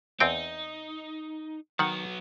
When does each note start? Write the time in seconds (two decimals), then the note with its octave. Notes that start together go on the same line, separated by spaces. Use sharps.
0.20 E2 C4 D#4 G5
1.79 D#3 F#3 B3 F#5